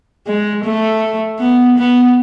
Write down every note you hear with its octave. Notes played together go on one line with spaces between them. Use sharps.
G#3
A3
B3
B3